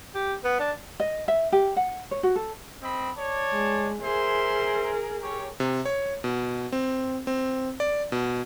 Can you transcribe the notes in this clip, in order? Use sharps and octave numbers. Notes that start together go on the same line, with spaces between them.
G4
B3
D4
D#5
E5
G4
F#5
C#5
F#4
A4
C4 D#5 B5
C#5 D5 A5
G#3
G#4 A#4 C5 E5 C6
G4 C#5
C3
C#5
B2
C4
C4
D5
B2